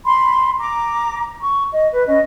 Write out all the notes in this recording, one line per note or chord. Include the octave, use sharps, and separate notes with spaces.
B5 C6
A#5 D6
C#6
D#5
B4
C#4 D#5